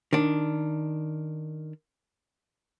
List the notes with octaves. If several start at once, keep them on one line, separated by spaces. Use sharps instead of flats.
D#3 D4